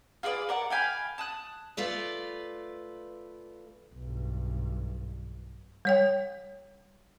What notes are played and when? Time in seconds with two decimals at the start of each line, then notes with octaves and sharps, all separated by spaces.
0.23 F4 G#4 B4 D5
0.49 A#4 D5 F#5
0.70 F5 G5 G#5 B5
1.18 A5 D#6 F#6
1.77 A3 F4 B4 D5
3.95 B1 G2
5.85 G3 C#5 G5